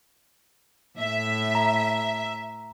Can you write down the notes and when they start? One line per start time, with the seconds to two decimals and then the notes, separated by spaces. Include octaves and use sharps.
0.99 A2 E5
1.55 A#5